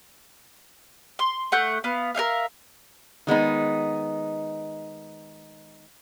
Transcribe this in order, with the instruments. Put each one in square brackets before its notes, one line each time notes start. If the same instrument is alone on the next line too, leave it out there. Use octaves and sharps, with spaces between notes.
[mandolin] C6
A3 F#5 G6
B3 F5
A#4 C5 E5 F5
[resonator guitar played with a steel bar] D#3 G#3 B3 D#4